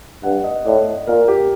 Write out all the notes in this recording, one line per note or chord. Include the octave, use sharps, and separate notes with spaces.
G2 F#5
D#5
A2 D5
A#2 A#4
G4